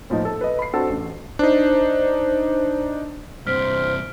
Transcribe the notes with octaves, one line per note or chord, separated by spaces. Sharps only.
A2 F3 A#3 D#4 D#5
A4
B4 D#5
B5 C7
C4 D4 F#4 A4
A1
D4 D#4 C5
G2 C3 C5 F6 B6 D7